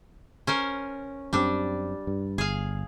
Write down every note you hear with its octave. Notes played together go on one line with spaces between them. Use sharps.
C#4 A#4 C5
F#2 G3 C4 D4
G2
G1 G#4 F5